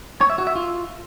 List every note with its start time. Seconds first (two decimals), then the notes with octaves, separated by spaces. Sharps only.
0.21 C#5
0.30 E5
0.38 F#4
0.47 E5
0.55 F4